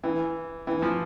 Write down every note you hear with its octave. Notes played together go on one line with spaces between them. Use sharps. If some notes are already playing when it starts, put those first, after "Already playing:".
E3
E3
F3